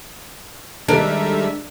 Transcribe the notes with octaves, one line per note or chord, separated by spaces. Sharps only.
D#3 G3 G#3 D4 A4 A#4 E5